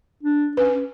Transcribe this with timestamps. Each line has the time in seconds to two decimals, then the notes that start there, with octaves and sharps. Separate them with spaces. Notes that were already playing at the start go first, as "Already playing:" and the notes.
0.23 D4
0.57 C#4 B4